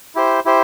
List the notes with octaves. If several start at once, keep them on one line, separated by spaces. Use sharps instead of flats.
E4 G4 C5
E4 G4 C5